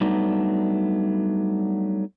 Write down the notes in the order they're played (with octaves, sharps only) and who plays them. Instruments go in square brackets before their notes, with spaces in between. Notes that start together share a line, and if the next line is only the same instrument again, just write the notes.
[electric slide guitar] F#3 G3 A3 B3 D4 D#4